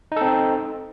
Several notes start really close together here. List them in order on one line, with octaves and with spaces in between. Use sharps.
D#4 A4 C4